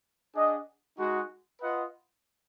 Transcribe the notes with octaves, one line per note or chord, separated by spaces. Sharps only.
D4 G#4 D#5 F#5
G#3 D#4 F#4
F4 B4 D#5 F#5